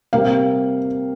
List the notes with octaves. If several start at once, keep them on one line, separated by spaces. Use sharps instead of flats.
C3 G3 A#3 F5